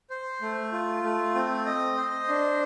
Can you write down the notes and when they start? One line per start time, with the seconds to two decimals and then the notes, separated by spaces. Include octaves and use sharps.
0.10 C5
0.41 A3
0.72 F4
1.03 A3
1.35 C4
1.66 D#5
1.97 C5
2.28 D4